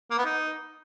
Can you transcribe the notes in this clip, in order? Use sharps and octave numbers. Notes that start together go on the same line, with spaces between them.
A#3
B3
D#4